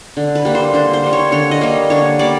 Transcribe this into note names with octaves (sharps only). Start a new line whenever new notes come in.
D3
B4
G3 A#3
C5
D3 C5
C5
G3 A#3
C#5
D3 C#5
D#5
G3 A#3
D3 C#5
G3 A#3 D5